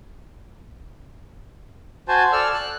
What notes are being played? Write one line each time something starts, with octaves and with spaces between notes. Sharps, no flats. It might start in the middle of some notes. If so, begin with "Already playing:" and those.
F#4 C5 G#5 A5
A4 D5 E6 F6
F#6